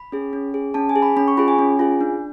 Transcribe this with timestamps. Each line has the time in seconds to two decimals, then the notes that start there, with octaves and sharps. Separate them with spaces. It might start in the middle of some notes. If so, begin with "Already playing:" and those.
Already playing: B5
0.12 C#4 G#4
0.33 C#4
0.54 G#4
0.74 C#4 A5
0.89 G#5
0.96 G#4
1.02 B5
1.17 C#4 B5
1.28 C#6
1.37 F4 G#4 B5
1.48 G#5
1.59 C#4
1.79 F4 G#4
2.01 D4